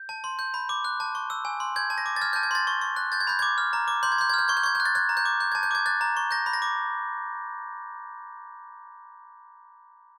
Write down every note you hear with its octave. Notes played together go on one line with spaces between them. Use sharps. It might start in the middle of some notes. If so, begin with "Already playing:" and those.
Already playing: G6
A5
C6
G6
B5
D6
F#6
A5
C#6
E6
G#5
C6
G6 G#6
A5
A#6
D6
A6
F6 G#6
A5 G6
G#6
C6 A6
C#6
C#6
F#6
G6 A6
G#6
B5 G6
D6 G#6
F6
A#5
D6
C6 G6
G#6
C6 G6
G#6
F6 G6
C#6 G#6
G6
C#6 G#6
F#6 G6
A6
F#6 G#6
A#5
G6
D6
G6
A5 G#6
G6
D6 G#6
F#6 A6
A#5
C#6
G6 A#6
B5
A#6
D6